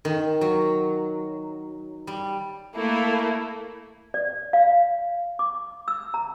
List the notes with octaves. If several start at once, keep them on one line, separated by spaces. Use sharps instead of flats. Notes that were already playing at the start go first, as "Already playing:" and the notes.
D#3
F#3
G3
A3 A#3 E4
D5
F5
D6
E6
A#5